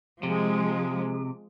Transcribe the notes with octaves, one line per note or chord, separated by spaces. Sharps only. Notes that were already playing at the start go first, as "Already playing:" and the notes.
C3 F3 G#3